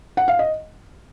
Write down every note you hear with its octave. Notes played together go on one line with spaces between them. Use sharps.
F#5
F5
D#5